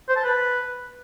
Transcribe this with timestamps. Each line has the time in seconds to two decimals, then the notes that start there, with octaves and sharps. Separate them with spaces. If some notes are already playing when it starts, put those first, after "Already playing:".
0.09 C5
0.16 A5
0.24 B4